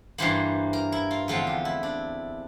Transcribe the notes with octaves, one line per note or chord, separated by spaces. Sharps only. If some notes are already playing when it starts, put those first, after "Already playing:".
G2 E3 A#3 C5
A#4
E4
F4
E2 D3 F3 A3 C4 F4
G4
E4
D4